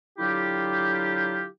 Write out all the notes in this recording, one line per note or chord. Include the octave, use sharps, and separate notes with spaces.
D3 F#3 E4 F4 G4